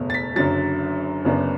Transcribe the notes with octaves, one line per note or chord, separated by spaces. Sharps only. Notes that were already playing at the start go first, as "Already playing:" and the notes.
Already playing: F#1 E2 B2 A3
A6
B6
F#1 F#2 D3 F#3 A6
F#1 F#2 D3 B3 D4